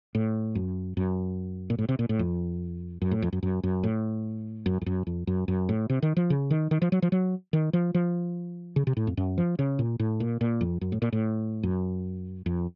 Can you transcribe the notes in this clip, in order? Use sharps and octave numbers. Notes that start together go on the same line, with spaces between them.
A2
F#2
F#2
A#2
A2
C3
A#2
A2
F2
F#2
A2
F2
F#2
F#2
F#2
A2
F#2
F2
F#2
F2
F#2
F#2
A2
C3
D#3
F3
C#3
D#3
D#3
F3
F#3
F3
F#3
D#3
F3
F3
C#3
C3
A2
F2
F#2
F3
C#3
A#2
A2
A#2
A#2
F2
F#2
A2
A#2
A2
F#2
F2